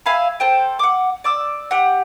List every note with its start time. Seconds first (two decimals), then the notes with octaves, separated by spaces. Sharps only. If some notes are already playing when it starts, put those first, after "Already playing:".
0.06 E5 F5 G#5 B5
0.40 A4 C5 G5
0.79 F#5 D6
1.24 D5 D6 E6
1.71 G4 F#5